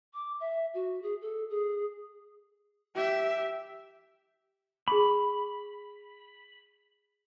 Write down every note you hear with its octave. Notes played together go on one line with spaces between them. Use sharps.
D6
E5
F#4
G#4
A4
G#4
G4 E5
G#4 B5 C#6 D6